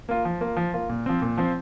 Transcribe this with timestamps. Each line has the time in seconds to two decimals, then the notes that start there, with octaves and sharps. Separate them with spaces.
0.09 A#3 F4
0.25 F3
0.41 A#3 F4
0.56 F3
0.74 A#3 F4
0.89 A#2
1.06 F3 C4
1.22 A#2
1.38 F3 C4